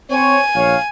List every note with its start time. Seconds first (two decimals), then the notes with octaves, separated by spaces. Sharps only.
0.11 C4 C5 C#5 G#5
0.55 A#1 C#5 F5